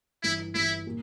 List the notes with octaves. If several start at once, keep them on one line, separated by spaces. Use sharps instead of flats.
G1 G2 E3 E4
G1 G2 E3 E4
A#2